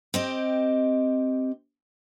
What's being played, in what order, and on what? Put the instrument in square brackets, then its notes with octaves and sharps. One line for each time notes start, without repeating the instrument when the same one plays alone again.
[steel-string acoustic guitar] C4 G4 D#5